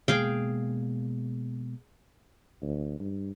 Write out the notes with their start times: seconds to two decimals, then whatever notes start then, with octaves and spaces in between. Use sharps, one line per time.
0.08 B2 G#3 A#3 G#4 F5 G5
2.62 D2
3.00 G2